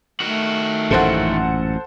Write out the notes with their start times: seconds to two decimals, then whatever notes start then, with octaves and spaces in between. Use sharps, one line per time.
0.20 D#3 A3 F#4
0.91 A1 F#2 A#2 A4 C5 F#5